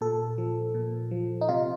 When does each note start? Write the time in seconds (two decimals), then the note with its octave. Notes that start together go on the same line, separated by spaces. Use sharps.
0.01 A#2 A4
0.38 F3
0.75 A#2
1.11 F3
1.41 D#4
1.49 C3 F4